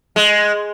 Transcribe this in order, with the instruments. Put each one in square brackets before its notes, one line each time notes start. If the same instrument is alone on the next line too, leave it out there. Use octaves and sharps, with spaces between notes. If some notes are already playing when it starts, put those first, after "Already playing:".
[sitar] G#3